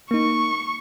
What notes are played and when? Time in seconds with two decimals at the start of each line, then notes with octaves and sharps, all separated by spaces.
0.11 A#3 D#4 C#6